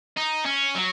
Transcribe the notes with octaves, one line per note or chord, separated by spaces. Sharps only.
D#4
C#4
F#3